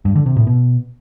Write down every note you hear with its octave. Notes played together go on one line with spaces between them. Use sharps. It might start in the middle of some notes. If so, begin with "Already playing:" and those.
G2
D3
C3
A2
B2